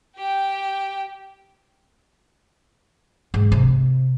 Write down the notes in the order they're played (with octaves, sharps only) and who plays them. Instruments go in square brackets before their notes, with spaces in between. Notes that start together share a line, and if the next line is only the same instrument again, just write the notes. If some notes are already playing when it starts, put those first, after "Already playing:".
[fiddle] G4 G5
[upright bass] G#2
C3